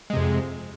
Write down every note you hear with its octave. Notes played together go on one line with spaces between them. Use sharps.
F2 C3 G#3